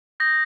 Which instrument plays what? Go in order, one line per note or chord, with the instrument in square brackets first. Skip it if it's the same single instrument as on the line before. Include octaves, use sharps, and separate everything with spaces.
[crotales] D#6 G6 A#6